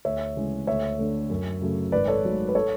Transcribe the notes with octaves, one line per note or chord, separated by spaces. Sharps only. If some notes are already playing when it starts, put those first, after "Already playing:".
D2 C#5 E5
C#3 E3 G#3
D2 C#5 E5
D3 A3
F#2
C#3 F#3 A3
G#1 B4 D5
A4 C#5
G#2 F#3 A3
B4
A4 C#5